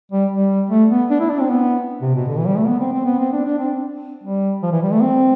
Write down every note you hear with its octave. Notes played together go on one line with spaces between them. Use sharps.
G3
G3
A3
B3
D4
E4
D4
C4
B3
C3
B2
D3
E3
G3
A3
B3
C4
C4
B3
C4
D4
D4
C4
G3
F3
E3
G3
A3
C4